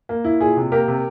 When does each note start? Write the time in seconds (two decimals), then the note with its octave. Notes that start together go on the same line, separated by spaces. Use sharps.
0.09 A#3
0.24 E4
0.40 A#2 G#4
0.57 C3
0.72 A#3 G4 A#4
0.88 C3